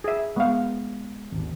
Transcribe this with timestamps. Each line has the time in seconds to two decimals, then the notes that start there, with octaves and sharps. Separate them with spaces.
0.04 G#4 E5
0.36 G#3 B3 F5
1.32 G#1 D#2